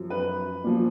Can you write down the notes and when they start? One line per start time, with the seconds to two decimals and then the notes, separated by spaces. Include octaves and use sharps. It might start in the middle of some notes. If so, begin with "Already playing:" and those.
Already playing: F#2 F3
0.10 B4
0.64 A#2 F3